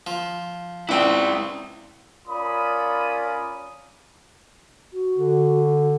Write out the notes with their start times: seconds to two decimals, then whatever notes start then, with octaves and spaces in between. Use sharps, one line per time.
0.07 F3
0.89 C#2 C4 E4 D5
2.28 C#4 F4 A#4 D5 B5 D#6
4.93 F#4
5.17 D3